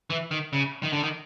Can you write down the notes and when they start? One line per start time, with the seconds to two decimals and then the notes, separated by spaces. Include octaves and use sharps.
0.10 E3
0.31 D#3
0.53 C#3
0.83 D#3
0.93 D3
1.03 D#3